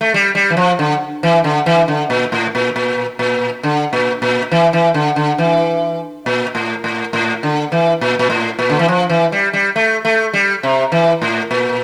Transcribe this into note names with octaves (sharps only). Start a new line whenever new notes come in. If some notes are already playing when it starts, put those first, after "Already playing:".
A3
G3
G3
E3
F3
D3
E3
D3
E3
D3
A#2
A2
A#2
A#2
A#2
D3
A#2
A#2
E3
E3
D3
D3
E3
A#2
A2
A2
A2
D3
E3
A#2
A#2
A2
A#2
D3
E3
F3
E3
G3
G3
A3
A3
G3
C3
E3
A2
A#2